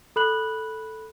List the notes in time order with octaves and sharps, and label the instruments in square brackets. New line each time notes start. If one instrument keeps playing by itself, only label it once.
[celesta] A4 B5 F#6 F#7